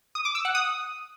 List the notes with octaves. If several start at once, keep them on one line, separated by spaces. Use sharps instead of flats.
D#6
D6
E6
F#5
D#6